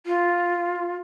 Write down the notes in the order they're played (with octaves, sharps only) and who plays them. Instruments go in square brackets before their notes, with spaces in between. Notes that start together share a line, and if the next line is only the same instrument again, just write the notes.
[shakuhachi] F4